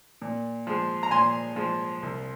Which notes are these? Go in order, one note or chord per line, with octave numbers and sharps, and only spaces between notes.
A#2
F3 G#3
A#5
A#2 G#5 C6
F3 G#3
C2